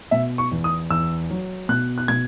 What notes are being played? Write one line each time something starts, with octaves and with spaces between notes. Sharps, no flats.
B2 E5
C#6
E2
D#6
E2 E6
F#3
B2 F#6
F#6
B2 G#6